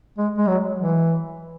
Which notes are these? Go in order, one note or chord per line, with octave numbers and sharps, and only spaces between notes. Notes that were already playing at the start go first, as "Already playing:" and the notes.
G#3
G#3
F#3
E3